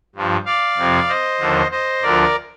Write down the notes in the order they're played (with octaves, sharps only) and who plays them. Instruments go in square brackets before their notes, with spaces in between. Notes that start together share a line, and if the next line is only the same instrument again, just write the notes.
[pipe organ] G2 F3
D5 F5
F2 C3 F3
C5 D#5
D#2 D3 F3
C5 D#5
D2 D3 F3 A#4 D5